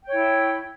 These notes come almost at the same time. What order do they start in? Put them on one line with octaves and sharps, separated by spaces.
G5 C#5 E4